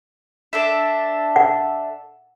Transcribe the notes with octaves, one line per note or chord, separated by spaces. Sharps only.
D4 A4 E5
F#5